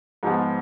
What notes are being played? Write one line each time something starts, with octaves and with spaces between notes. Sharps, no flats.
G#2 F3 B3 F4